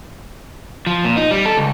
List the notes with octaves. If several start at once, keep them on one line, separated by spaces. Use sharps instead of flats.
F3
A#2
D#4
G3
A4
C#2